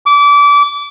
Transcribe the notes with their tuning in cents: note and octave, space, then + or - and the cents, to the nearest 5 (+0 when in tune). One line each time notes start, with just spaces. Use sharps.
D6 -25